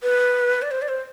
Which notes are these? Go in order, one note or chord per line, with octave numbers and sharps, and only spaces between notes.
B4
D5
C5
D5
C5